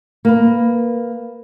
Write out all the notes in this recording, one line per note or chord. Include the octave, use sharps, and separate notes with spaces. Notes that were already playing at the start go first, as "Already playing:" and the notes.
A#3 B4